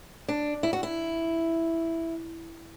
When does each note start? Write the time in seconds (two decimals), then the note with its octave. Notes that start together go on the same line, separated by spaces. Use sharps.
0.28 D4
0.63 E4
0.73 F#4
0.83 E4